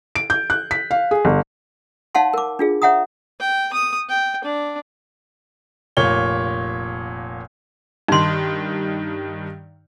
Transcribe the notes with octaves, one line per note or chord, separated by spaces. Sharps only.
D7
G6
F#6
B6
F5
G#4
G1
D#4 C#5 F5 F#5 A5 C6
A#4 D6
D4 F4 G#4
C#5 E5 F#5 A#5 D#6
G5
D#6
G5
D4
F1 A#2 C#5 G7
G2 D#3 D#4 C6